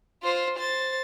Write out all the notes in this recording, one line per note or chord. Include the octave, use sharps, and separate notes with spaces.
F4 C5
C5 A6